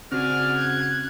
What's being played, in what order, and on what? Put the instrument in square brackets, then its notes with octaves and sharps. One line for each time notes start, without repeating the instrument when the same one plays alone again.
[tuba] C#3 [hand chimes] C4 F#4 [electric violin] D5 G#5 [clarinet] F6
[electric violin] F#6 G#6